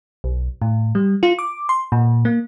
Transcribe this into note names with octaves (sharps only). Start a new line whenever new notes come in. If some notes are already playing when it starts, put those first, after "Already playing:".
B1
A2
G3
F4
D6
C6
A#2
A#3